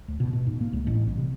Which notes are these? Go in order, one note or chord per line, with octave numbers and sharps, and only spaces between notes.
D2
B2
B2
G#2
A#3
C#2
A1
B1
C3